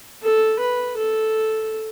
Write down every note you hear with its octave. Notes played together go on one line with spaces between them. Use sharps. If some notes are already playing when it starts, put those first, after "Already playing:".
A4
B4
A4